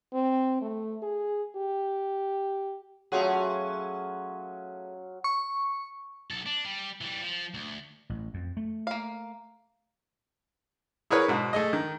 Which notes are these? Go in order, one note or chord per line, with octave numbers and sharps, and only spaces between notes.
C4
A3
G#4
G4
F#3 A3 C#4 F4 G#4 F#5
C#6
B1 A4
D4
G3
E3 G3
F3
D2
A1
F2
A3
A#3 F5
E4 G#4 A#4 B4 C#5
G#2 B2
A3 G#4 D#5
D#3